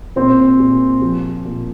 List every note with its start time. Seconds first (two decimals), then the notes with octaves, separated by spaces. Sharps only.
0.16 A#2 C4 C5
0.60 A#2
1.02 F3
1.45 A#2